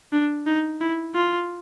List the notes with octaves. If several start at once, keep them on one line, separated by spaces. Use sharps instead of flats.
D4
D#4
E4
F4